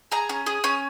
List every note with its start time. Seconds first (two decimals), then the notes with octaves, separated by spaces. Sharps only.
0.12 G#4 A#5
0.29 C#4
0.46 G#4
0.64 C#4